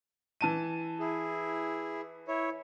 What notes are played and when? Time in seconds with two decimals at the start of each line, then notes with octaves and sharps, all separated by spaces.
0.41 E3 A5 D#7
1.00 E4 G#4
2.28 E4 C#5